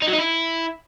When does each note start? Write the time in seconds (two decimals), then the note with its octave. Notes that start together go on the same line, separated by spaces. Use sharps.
0.02 D#4
0.08 F#3
0.13 D#4
0.19 E4